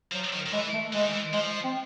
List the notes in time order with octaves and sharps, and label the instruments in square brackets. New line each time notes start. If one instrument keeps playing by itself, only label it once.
[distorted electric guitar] F3 [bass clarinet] F#3
[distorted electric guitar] D#3
D#3
[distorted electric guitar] E3 [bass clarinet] G#3
[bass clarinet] A3
[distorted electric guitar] E3 [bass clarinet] G#3
[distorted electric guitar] D#3
E3
[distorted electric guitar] F3 [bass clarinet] G#3
[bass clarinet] C4